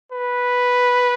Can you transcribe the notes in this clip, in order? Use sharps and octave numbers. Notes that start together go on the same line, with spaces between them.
B4